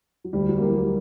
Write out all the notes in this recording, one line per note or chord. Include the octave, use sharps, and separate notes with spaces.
F#3
D2 G3
F#3
A#3
E3 G3
G3